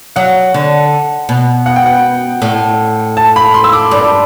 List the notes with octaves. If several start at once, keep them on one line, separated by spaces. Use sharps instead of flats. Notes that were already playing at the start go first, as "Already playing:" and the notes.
F#3 F#5
D3
B2
F#5
G5
F#5
A2
A5
B5
C6
E6
D6
G2 D6